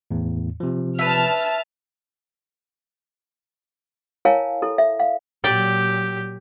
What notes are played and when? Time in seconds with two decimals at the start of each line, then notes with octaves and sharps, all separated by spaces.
0.11 E2 A2
0.60 C3 F3
0.99 B4 E5 A5 F6
4.25 E4 A#4 C#5 F5 G#5 A5
4.62 E4 A4
4.78 E5
5.00 F5
5.44 A#2 F#3 G4 D5 G5